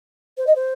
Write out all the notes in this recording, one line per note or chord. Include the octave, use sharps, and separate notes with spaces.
C5
D#5
C5